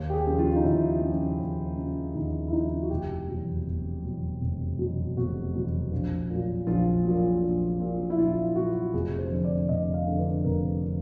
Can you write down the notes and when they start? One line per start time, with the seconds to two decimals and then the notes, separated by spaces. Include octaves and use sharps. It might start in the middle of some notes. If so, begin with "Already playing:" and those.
Already playing: D#2
0.10 G4
0.13 G#4
0.27 C#3 F3
0.39 F4
0.56 D#4
0.64 D#2 E4
1.02 C#3 F3
1.39 D#2
1.77 C#3 F3
2.15 D#2 D#4
2.47 E4
2.52 C#3 F3 D#4
2.82 F#4
2.90 F1 G4
3.28 E2 B2 F#3
3.66 F1
4.03 E2 B2 F#3
4.41 F1
4.79 E2 B2 F#3
5.17 F1 F#4
5.54 E2 B2 F#3
5.92 A#1
6.29 A#2 F#3
6.67 A#1 F4
7.05 A#2 F#3
7.43 A#1
7.80 A#2 F#3
8.10 E4
8.18 A#1 F4
8.56 A#2 F#3 F#4
8.93 F1 G#4
9.19 C5
9.31 F2 D3
9.44 D5
9.69 F1 D#5
9.94 F5
10.07 F2 D3
10.19 B4
10.44 F1 A#4
10.82 D3